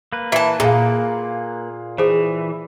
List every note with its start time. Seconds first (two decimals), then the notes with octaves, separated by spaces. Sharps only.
0.13 A#3 B4
0.32 E3 E5 A5
0.60 A#2 G#4 F5 A#5
1.98 E3 G#4 C5